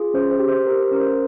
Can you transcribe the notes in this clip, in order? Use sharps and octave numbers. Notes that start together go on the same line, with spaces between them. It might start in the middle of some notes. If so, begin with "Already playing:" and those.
Already playing: F4 G#4
C#4 C5
C5
G4
C5
G4 A#4
C5
C#4 A#4
C5